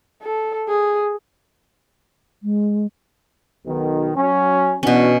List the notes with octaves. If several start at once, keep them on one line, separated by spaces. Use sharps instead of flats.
A4
G#4
G#3
B1 B2 D#3
F#3 C#4
B2 E3 C#4 D4 F#4